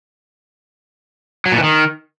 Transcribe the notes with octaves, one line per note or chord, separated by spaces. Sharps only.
F#3
A#2
E3
D#3